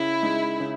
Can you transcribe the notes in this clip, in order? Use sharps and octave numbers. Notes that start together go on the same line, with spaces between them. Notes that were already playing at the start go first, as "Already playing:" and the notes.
Already playing: C#3 E4
G#3 D#4
C#3